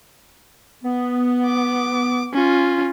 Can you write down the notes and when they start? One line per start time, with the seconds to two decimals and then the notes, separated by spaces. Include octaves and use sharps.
0.84 B3
1.47 D6
2.34 C#4 F4